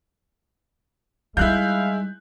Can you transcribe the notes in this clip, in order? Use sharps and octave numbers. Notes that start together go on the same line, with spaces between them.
G3 G#3 D#4 E4 F5 F#6 G6